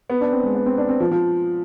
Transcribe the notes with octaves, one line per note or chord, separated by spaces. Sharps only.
B3
D4
C4
G#3
B3
C4
D4
C4
F3
F3